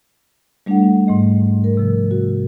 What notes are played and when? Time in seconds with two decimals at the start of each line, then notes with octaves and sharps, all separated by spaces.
0.66 G3 A3 D4 E4 A4 F#5
1.07 G#2 A3 D#5
1.64 A#4
1.77 C3 F3
2.11 F#4